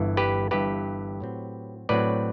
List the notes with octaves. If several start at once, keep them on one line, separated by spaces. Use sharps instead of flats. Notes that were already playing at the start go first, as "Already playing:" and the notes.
Already playing: G1 G2 E3
G4 B4
G1 G2 E3 G4 B4
A2 F#3 C4
A2 F#3 C4 B4 D5